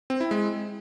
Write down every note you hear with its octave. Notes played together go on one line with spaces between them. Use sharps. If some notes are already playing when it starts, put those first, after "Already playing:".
C4
E4
G#3